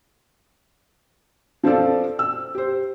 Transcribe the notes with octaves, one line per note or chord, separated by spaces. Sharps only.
F3 C4 F4 A4 D5
E6
G4 C5